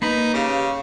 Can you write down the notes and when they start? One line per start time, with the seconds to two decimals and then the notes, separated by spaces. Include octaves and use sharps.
0.02 A#3 D#4 B4 B5
0.34 C#3 G4 F5 D6